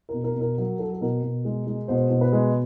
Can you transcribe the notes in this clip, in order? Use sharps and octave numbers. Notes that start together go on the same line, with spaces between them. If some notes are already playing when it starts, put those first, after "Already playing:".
B2 A#4
A#4
B2
A#4
F#3 A#4
F#3 A4
A4
B2 A#4
B2
G#3
G#3
B2 C5
B2
B4
G#3